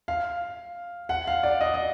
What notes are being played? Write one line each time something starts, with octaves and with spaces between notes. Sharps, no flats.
F5
F#5
F5
D5
D#5
D#5